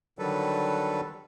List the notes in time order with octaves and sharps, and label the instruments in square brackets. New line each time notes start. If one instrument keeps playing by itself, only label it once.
[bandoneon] D3 D#3 F#3 G3 A4 B4